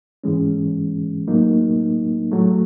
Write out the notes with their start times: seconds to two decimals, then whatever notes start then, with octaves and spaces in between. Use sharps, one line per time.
0.24 G#2 E3 G#3 C#4
1.28 A2 F#3 A#3 D#4
2.32 A2 F#3 A3